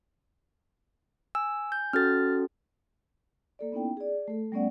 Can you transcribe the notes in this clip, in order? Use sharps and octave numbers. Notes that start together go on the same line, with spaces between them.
G#5 E6
G6
C#4 F#4 A4 F6 A6
A#3 A4 D5
B3 C#4 D#4 E4 G5
G#4 D5
A3 A4
G3 A3 B3 C#4 D5 F#5